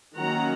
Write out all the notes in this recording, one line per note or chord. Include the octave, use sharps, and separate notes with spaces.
D#3 F#3 A#3 C#4 F#5 A#5